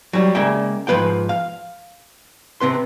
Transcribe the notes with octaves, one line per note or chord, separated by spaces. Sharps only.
F#3 G3
C#3 G#3 A#3 D5 E5 G5
G#2 F3 F#3 B4 F5 G5
F5
C3 C4 B4 C6